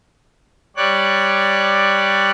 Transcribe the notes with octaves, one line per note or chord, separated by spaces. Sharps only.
G3 C#5 D5 F#6